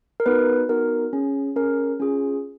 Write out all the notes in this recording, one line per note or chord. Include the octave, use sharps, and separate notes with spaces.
A#4
B3 D#4 F#4 B4
B3 D#4 F#4 A#4
C#4 G#4
C#4 G#4 A#4
C#4 F4 G#4